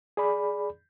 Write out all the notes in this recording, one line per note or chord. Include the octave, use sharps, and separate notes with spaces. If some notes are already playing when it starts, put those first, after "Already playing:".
G#4 D5 B5